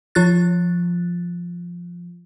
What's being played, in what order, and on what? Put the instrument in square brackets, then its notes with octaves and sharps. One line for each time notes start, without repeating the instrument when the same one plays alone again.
[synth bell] F3 F4 F#6 A6